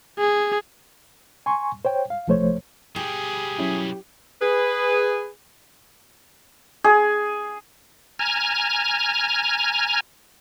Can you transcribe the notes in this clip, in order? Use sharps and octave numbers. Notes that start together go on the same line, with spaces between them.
G#4
G#5 C6 C#6
C5 C#5 G5
F5
C2 F3 A3 C5 C#5
B2 G3 G4 G#4
F#3 C#4 E4
G#4 B4
G#4
G#5 A#5 F6 G#6